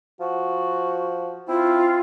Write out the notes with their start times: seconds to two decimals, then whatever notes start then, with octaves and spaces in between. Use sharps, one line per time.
0.21 F3 F#4
1.49 C4 E4 F4